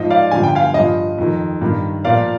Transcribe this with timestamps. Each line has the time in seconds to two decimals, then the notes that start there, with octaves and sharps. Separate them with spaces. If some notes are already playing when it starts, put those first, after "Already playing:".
Already playing: G#2 F3 D#5
0.10 D5 F5
0.31 G2 D3 F3 G#5
0.43 G5
0.55 F5 G#5
0.74 G2 F3 D#5
1.18 F2 D#3
1.62 G2 D#3
2.04 A#2 F3 D5 F5